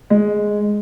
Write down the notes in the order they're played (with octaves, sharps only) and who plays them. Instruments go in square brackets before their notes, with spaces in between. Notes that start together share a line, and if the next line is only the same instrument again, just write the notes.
[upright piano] G#3